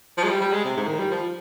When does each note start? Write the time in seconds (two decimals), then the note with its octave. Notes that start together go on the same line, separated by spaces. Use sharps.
0.17 F3
0.24 G#3
0.29 G3
0.41 G3
0.52 G#3
0.64 C3
0.77 G#2
0.88 D#3
0.99 G3
1.11 F3